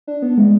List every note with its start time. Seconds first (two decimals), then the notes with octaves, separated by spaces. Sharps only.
0.07 D4
0.22 B3
0.38 G#3